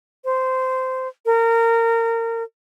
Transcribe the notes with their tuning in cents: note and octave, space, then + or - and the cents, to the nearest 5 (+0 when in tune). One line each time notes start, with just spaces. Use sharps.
C5 -15
A#4 -25